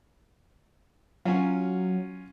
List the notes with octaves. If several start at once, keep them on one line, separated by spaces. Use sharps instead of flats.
F#3 C#4 F4